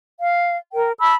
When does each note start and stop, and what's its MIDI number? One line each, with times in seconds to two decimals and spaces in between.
0.20 0.57 77
0.73 0.91 70
0.73 0.91 79
0.99 1.15 81
0.99 1.15 83
0.99 1.15 88